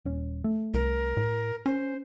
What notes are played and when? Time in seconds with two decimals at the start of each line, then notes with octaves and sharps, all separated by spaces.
0.05 D#1 C#4
0.44 A3
0.74 C2 A#4
1.17 A2
1.66 C#4 C5